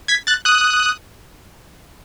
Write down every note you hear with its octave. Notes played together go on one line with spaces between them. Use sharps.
G#6 B6
F#6 A6
D#6 F#6